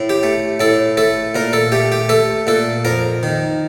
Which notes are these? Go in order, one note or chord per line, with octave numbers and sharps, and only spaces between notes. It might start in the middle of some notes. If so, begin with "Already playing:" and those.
Already playing: A2
G4
A3
A2 A4
A3 A4
A#2 A#4
A4
A3 G4
G4
A3 A4
A#2 A4
F2 A#4
D#3